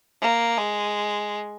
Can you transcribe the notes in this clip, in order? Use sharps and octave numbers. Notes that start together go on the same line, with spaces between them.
A#3
G#3